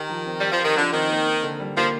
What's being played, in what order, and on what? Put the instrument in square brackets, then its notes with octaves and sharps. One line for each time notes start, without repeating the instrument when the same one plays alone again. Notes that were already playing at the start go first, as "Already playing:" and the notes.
Already playing: [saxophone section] D#3 [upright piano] G4 A#4
[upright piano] F3
C4
[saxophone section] G3 [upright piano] G4
[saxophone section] F3
[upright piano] A#4
[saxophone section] D#3
[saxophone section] D3 [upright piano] F3
[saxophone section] D#3 [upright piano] C4
[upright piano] A#3
D#4
D3
G3
[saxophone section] F3 [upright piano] A#3